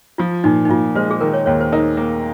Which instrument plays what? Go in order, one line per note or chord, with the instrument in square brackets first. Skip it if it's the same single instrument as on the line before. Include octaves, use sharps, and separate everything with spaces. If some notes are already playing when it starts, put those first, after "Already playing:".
[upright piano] F3 [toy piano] F4
[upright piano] A#2 [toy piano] D#4
[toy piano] D#4
[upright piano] A#2 [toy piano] F4
[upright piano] G#3 [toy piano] C5
[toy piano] G#4
[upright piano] D#3 [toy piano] A#4
[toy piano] C#5
[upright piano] D#2 [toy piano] C#5
[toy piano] C5
[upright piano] D#4 [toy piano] A#4
[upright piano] A#3